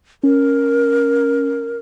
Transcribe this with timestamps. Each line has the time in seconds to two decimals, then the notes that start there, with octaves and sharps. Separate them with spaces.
0.23 C#4 A#4